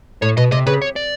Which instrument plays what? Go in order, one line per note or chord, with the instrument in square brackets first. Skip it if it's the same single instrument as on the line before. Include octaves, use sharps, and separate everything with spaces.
[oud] A2 [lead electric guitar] C#5
[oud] B2 [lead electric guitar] D#5
[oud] C3 [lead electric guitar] D#5
[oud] C#3 [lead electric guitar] B4
[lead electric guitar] C#5
D5